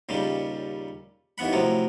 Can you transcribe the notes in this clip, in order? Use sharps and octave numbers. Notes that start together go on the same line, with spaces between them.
D#2 A#2 C#3 G3
D#2 E3 B3 F#5 B5
A2 C3 F3 F#3